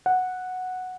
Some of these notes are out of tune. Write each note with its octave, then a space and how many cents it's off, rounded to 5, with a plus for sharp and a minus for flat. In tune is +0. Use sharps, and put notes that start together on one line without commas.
F#5 -5